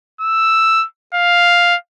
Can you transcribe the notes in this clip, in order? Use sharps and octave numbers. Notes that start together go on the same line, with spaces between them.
E6
F5